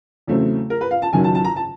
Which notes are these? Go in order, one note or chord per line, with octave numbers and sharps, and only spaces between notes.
E2 C#3 F#3 A3 C4
A#4
B4
F5
A5
F#1 F#2 D#3 F#3 G#5
A5
A5
A#5
A5